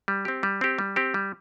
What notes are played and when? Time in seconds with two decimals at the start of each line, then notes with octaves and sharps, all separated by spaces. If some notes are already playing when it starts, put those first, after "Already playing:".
0.08 G3
0.25 C4 G4
0.43 G3
0.61 C4 G4
0.78 G3
0.96 C4 G4
1.14 G3